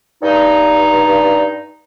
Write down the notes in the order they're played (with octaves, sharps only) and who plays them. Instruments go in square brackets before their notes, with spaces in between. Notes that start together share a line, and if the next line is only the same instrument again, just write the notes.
[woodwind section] G2 D#4